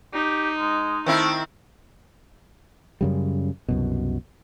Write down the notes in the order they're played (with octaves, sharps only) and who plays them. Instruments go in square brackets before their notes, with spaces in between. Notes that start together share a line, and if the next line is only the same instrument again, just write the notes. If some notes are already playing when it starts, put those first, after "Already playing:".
[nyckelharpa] D#4 [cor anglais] G4
[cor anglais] G#3
[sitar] D#3 C4 E4 [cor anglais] A3
[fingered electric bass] F#2 C#3 G3
C2 F#2 B2